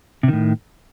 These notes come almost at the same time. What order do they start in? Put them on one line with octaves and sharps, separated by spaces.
C3 D#3 A2